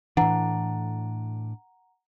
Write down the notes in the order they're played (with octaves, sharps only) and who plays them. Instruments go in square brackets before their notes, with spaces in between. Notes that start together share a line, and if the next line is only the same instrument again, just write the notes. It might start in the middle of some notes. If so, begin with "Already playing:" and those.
[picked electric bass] A2 D4 [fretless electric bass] E3 [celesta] F#5 A#5